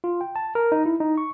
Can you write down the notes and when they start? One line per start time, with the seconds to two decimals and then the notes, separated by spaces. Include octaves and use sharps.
0.04 F4
0.21 G5
0.36 A5
0.55 A#4
0.72 D#4
0.86 E4
1.00 D#4
1.18 C#6